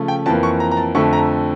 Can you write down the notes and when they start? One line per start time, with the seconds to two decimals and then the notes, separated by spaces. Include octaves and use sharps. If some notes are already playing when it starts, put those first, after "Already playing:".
Already playing: C#3 F3 A3
0.08 G5
0.26 F2 E3 A#3 A5
0.43 C#6
0.60 A#5
0.71 A#5
0.77 A5
0.95 F2 D3 A3 C#6
1.13 A#5